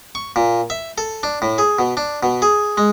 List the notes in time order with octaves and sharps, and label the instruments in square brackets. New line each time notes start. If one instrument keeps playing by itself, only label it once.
[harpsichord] C#6
A#2
E5
A4
D4
A2
G#4
B2
D4
B2
G#4
G#3